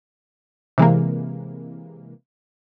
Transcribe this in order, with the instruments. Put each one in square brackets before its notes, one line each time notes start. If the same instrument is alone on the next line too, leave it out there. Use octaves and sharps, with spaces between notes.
[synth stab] C3 E3 G#3 A#3